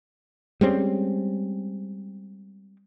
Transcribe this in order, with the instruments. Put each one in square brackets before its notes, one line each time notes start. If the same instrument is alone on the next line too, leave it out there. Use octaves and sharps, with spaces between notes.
[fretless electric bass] G3 G#3 C4 C#4